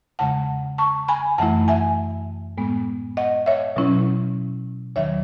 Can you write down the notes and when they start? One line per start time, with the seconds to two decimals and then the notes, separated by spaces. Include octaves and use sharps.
0.19 E2 C#3 G#3 F#5 A5
0.78 A5 C#6
1.08 G#5 B5
1.38 F#2 E3 A3 E4 F#5 A5
1.68 E5 G#5
2.57 A2 G#3 B3
3.17 D#5 F#5
3.46 C#5 E5
3.76 B2 F#3 C#4 E4
4.96 D#2 D#3 F#3 C#5 E5